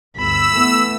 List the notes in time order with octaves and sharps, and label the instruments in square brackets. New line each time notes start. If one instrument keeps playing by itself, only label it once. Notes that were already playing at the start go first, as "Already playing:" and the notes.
[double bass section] G1 D2 [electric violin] B5 [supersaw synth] E6
[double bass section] E3 A3 B3